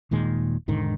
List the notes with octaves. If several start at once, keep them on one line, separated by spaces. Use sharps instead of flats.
D#1 A#2 D#3 G#3
E1 G#2 D3 D#3